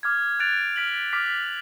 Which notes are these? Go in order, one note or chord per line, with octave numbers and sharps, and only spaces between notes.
D6 F6 G#6
F#6 A6 D7 F7
F6 B6 D7 F#7
D6 F6 B6